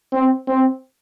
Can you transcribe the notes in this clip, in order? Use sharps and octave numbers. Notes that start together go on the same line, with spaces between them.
C4
C4